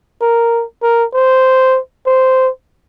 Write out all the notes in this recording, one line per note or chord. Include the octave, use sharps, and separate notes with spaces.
A#4
A#4
C5
C5